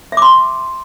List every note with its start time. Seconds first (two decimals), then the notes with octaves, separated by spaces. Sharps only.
0.12 E5
0.17 D6
0.22 C6